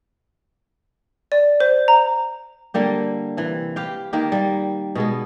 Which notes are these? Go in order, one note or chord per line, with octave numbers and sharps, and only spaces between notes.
D5
C5
A#5
D3 G3 A#3 G4
C3 E3
G4 B4 F5 G5
D#3 A#3 G4
G3 A#3
B2 G#3 B3